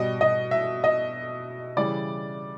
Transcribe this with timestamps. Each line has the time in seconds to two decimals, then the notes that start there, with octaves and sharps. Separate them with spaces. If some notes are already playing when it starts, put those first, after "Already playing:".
Already playing: B2 G3 D#5
0.21 D#5
0.51 E5
0.84 D#5
1.76 C#3 E3 G3 D5